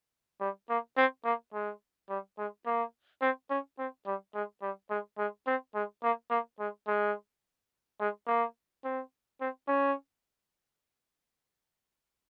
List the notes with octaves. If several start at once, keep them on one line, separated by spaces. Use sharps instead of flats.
G3
A#3
C4
A#3
G#3
G3
G#3
A#3
C4
C#4
C4
G3
G#3
G3
G#3
G#3
C4
G#3
A#3
A#3
G#3
G#3
G#3
A#3
C4
C4
C#4